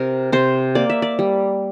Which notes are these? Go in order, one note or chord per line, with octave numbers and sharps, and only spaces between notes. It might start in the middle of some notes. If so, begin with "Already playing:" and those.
Already playing: C3 A#4
C3 C5
A#3 D5
E5
D5
G3